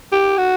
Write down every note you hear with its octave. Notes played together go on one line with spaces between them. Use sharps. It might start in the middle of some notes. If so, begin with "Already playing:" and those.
G4
F#4